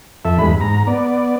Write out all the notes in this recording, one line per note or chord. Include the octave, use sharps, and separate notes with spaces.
F2 A4 E5
E2 G2 G#3 B5
G#2 A#5
B3 D5